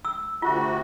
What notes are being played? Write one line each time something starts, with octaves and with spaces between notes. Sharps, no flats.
E6
D2 C3 F4 F#4